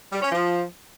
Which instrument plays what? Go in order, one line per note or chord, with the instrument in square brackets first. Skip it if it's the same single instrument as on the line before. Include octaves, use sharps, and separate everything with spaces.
[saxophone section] G3
C#4
F3